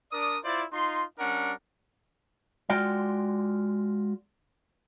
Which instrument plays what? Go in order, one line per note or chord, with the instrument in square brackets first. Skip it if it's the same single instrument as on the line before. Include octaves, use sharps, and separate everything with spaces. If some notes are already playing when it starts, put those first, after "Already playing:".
[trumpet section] D4 A#4 D5 D#6
E4 F4 C5 D5
D#4 F4 C6
G3 C#4 D4 A#4 F#5
[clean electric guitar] G#3 F4 F#4 D5 G5